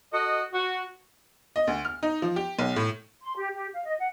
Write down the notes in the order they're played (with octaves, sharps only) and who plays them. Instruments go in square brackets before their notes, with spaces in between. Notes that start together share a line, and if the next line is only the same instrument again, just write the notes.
[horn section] F#4 A4 D#5
F#4
[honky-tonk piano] D#5
D2
F6
D#4
F3
G4
B1
A2
[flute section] C6
G4
G4
F5
D#5
F#5